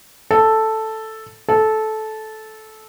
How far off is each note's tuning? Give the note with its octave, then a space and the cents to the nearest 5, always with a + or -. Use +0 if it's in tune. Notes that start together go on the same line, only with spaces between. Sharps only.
A4 +0
A4 -15